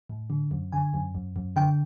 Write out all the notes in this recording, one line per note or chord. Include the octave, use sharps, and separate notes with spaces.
A2
D3
F#2
D3 G#5
F#2
F#2
F#2
D3 G5